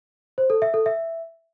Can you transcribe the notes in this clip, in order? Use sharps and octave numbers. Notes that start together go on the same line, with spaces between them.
C5
A4
E5
A4
E5